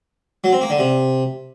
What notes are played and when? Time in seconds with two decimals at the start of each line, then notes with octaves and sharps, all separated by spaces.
0.44 F#3
0.53 C4
0.61 A#3
0.70 D3
0.79 C3